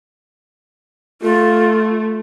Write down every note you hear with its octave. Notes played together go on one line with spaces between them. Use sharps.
A3 F4